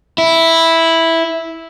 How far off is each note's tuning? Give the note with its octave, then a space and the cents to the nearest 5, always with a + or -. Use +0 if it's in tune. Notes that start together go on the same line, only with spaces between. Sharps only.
E4 -5